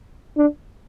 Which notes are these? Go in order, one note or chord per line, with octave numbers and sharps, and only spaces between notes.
D4